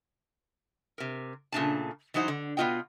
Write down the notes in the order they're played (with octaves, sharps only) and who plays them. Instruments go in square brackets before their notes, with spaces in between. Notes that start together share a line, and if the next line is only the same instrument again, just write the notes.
[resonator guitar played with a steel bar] C3 A#4
A#2 C#3 A3 D4 G#5 A5
E3 F#3 D#4 C5 F#5
D3
B2 B3 D#4 F4 D#5 G5